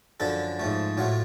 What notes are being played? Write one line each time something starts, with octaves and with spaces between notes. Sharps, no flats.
F#2 D3 F3 A4
G#2 F3 A3
A2 F#3 A3 F4